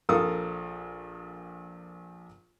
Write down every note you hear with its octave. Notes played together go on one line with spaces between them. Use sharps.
A#1 A4 A#4 F5 D#6